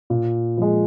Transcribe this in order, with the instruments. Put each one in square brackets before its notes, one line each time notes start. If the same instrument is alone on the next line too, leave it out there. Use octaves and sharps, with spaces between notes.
[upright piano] A#2
F3 G#3